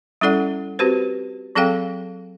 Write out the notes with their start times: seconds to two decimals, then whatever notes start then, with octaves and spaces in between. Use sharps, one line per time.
0.21 G3 C#4 E4 A4 D5 F#5
0.79 C4 F#4 G4 B4 C5
1.55 F#3 C4 G#4 A4 F5 G5